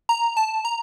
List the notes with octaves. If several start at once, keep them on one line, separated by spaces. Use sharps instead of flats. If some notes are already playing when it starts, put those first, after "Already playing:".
A#5
A5
A#5